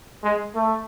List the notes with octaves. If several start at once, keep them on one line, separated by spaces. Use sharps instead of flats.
G#3
A3